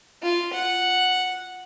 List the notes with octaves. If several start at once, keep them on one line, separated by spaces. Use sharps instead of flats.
F4
F#5